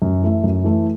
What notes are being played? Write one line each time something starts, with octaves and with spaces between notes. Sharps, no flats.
F#2
E3 A3 E4
F#2
E3 A3 E4